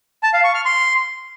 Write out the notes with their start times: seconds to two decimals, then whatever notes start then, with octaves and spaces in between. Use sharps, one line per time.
0.23 A5
0.34 F5
0.44 C#6
0.55 F6
0.65 C6